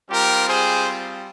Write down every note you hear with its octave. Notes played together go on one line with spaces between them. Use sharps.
G3 C4 F4 G4 A#4
G#4 C5